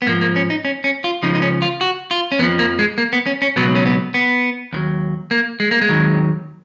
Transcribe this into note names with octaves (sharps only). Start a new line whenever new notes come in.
B3
G#2 F3 A#3
A#3
C#4
D#4
C#4
C#4
F4
C#2 C#3 F3 D#4
D#4
C#4
F4
F#4
F4
C#4
F2 F3 B3
A#3
G#3
A#3
B3
C#4
C#4
C#2 B2 F#3 B3
C#4
B3
B3
D#2 D#3 F#3
A#3
G#3
A#3
G#3
D#2 D#3 F#3